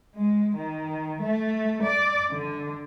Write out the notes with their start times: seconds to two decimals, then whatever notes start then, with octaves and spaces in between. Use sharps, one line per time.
0.15 G#3
0.57 D#3
1.22 A3
1.83 D5
2.31 D3